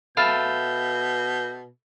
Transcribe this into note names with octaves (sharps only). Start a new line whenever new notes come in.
B2 A4 E5 F5 B5 F6 G6 A6